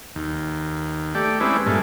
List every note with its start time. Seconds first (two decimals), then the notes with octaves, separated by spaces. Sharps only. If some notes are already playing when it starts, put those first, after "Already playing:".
0.16 D#2
1.15 A3 G4 D5
1.40 G#3 C4 C#4 E4 B4 D5
1.66 G2 A#2 G#3 A3